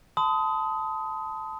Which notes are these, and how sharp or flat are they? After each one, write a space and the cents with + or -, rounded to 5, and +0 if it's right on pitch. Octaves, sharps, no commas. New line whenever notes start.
A5 +0 C6 -45 D#6 +20